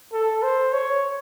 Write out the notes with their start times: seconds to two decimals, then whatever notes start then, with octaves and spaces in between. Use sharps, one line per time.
0.13 A4
0.43 C5
0.73 C#5